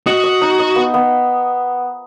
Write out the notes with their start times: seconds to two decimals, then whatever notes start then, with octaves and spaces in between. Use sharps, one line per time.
0.06 F#4 D#5
0.24 D#5
0.41 D#4
0.59 D#5
0.76 B3
0.94 B3